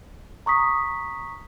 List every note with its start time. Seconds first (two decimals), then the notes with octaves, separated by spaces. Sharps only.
0.46 A#5 C#6 D#6 B6